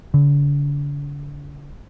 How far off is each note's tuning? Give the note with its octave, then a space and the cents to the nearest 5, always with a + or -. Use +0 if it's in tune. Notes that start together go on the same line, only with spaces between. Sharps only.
D3 -40